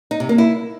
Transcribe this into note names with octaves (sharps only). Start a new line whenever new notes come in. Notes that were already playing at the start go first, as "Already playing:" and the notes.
D#4
C3
A#3
E4